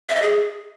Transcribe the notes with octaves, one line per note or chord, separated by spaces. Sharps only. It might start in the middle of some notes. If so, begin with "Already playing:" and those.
E5
D#5
G#4